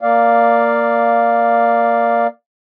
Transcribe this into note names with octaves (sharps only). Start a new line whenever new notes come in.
A#3 D5 F5